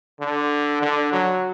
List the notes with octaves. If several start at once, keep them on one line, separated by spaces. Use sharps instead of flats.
D3
D3
F#3